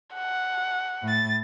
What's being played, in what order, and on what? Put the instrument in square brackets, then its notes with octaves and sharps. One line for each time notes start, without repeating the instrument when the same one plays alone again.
[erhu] F#5
[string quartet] A2 A6